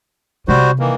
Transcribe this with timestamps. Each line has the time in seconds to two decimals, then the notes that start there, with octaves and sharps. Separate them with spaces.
0.48 C3 G3 F#4 C5
0.80 D#3 E3 A#3